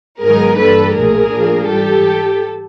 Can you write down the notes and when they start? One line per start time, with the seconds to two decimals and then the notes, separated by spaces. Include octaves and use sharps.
0.23 G#2 D#3 F#3 B3 D#4 G#4 A#4
0.59 G2 E3 G3 A#3 D4 A4 B4
0.96 B1 A#2 F3 A3 G#4 A#4
1.32 A2 F3 A#3 D4 F4
1.68 G#2 E3 G3 G4 A4